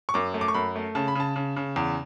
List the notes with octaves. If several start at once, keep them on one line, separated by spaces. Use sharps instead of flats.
C#6
F#2 D6
A3
D6
C#6
F#2 B5
A3
C#3 A5
B5
C#3 A5
C#3
C#3
E2